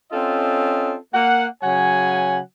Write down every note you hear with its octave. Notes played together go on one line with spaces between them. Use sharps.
C4 C#4 F4 A4 D#5 E5
A#3 F#5
C#3 F#3 C#5 F#5 G#5